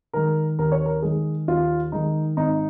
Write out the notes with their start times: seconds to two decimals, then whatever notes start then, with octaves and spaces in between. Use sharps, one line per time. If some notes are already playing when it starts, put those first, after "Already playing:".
0.13 D#3 G#3 A#4
0.59 D#2 A#4
0.72 C#5
0.86 A#4
1.02 D#3 G#3 G#4
1.48 D#2 F4
1.92 D#3 G#3 D#4
2.37 G#1 D#4